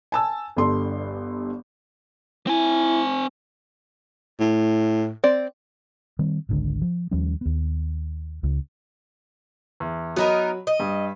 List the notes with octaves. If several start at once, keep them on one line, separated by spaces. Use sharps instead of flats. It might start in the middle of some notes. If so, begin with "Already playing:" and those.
G#5 A5 E6
G1 G2 A4 C6
C4 E4 G#5
A2
C4 D5
D#3 G3 C4
G#1 C#2 D3 G#3
F3
D#2 F3 G3 C#4
D#2 B3
C#2 C#3
E2
F#3 B3 D#4 A#4 B5
D#5
G2